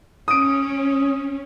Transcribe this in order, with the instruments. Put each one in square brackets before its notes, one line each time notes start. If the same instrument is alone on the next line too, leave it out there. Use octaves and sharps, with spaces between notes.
[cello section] C#4 [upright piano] D#6 D7